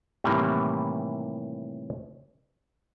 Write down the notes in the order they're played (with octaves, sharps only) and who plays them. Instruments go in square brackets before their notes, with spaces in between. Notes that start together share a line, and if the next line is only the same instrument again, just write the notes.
[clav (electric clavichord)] A2 C3 D#3 E3 G3 A#3